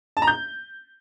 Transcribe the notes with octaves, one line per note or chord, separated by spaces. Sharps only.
A5
A#5
G6